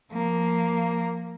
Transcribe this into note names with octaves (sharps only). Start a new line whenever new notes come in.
F3 A#3